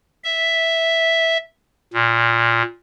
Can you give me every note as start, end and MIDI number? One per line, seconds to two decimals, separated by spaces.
0.24 1.37 76
1.94 2.62 46